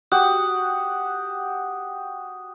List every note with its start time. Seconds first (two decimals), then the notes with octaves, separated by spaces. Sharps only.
0.12 F#4 G4 F#5 D#6